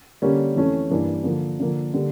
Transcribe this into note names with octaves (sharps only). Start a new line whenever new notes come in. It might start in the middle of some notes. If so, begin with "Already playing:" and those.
D3 G3 A#3 C#4
F2 E3 A3 C#4
G2 E3 A#3 D4
D3 F3 A#3
D3 F3 A#3
D3 G3 A#3